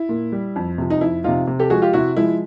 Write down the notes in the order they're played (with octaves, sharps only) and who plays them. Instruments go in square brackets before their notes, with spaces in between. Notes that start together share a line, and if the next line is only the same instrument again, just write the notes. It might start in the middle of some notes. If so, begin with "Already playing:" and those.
Already playing: [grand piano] E4
A#2
G3
F2
C3 F3
D#4
F2 E4
C3 F3 D#4 F4
C3
G4 A4
F3 G#3 F#4 G#4
F4 G4
C3 E4 F#4
F3 G#3 E4